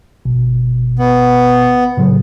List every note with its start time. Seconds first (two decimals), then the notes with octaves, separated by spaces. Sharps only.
0.25 G1 B2
0.99 B3
1.97 A2 C#3 F#3